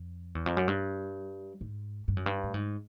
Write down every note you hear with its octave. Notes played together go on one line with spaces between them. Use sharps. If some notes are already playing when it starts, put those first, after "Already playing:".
Already playing: F2
E2
F2
F#2
G2
G#2
G2
F#2
G2
A2
G#2